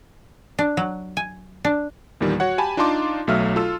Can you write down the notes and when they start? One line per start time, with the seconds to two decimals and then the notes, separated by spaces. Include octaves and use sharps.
0.59 D4
0.77 F#3
1.17 G#5
1.65 D4
2.21 E2 A#2 D#3 G3
2.40 F#4 C#5 F#5
2.58 G4 G#5 A5 B5
2.77 D4 D#4 F4 A5 C6 D6
3.27 B1 F#3 A3 E5 F5 F6
3.56 F4 A4 E6